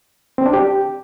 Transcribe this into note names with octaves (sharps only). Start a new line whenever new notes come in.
C4
D4
G4